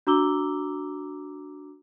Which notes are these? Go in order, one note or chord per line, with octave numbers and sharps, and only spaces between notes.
D4 F#4 A#5 D6 E6 G7